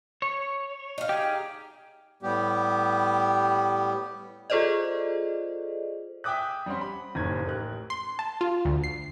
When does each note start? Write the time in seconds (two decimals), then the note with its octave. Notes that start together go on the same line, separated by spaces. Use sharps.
0.22 C#5
0.98 D#4 F5
1.09 G4 G#4
2.23 A2 G3 B3 G4
4.50 F4 G#4 A4 C5 D5 D#5
6.24 E5 G5 G#5 D6 D#6 F#6
6.66 G3 C4 C#4 F#5 C6
6.81 B5
7.15 F#1 D#2 A2 D#3 C#4 G#6
7.45 A1 A#4 F#6
7.90 C6
8.19 A5
8.41 F4
8.65 D2
8.84 C7